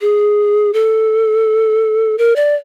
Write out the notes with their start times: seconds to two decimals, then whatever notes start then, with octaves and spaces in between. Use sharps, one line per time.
0.01 G#4
0.73 A4
2.18 A#4
2.36 D5